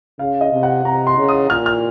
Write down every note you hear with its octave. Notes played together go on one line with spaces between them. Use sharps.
C#3 F5
D#5
C3
F#5
C3 A#5
C6
C#3
D#6
A#2 F6
F6